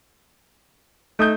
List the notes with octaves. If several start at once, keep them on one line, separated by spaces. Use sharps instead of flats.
A3 D#4 D#6 G6